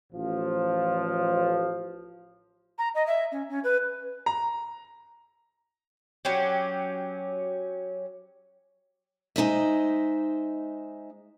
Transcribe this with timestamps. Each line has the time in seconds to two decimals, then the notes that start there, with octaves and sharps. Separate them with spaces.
0.13 A1 F3
2.78 A#5
2.95 D#5
3.07 E5
3.32 C#4
3.49 C#4
3.64 B4
4.26 A#5
6.25 F#3 C#4 G4
9.36 G#3 D#4 C5 E5